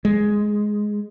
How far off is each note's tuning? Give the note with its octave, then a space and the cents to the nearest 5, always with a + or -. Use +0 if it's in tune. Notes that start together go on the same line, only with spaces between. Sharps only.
G#3 +5